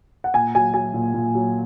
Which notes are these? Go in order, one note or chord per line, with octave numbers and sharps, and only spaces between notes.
F#5
A#2 G#5
F#3 G#5
F#3 G#5
A#2
A#2
F#3